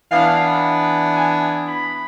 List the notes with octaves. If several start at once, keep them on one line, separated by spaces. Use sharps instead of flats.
E3 B3 D4 F5
G#5
B5